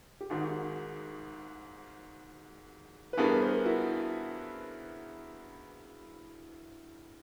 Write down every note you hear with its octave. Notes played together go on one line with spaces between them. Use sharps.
G4
G#1 G#2 D#3 F#4 G#4
B4
G2 E3 G3 B3 G#4 A#4
A#4 C5
E4 F#4